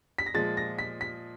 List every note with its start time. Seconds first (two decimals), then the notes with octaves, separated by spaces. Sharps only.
0.18 B6
0.26 A#6
0.34 A#2 F3 G#3 A6
0.57 A#6
0.79 B6
1.01 B6